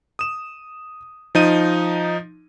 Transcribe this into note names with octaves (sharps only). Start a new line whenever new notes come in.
D#6 E7
F3 D#4 D#7